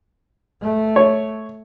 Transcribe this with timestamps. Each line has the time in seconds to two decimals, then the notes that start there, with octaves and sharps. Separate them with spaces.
0.62 A3
0.96 C#5